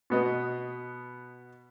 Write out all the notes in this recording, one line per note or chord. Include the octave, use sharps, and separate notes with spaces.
B2 B3 D#5